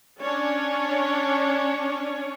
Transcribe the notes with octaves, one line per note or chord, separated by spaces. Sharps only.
C#4 D4 C#5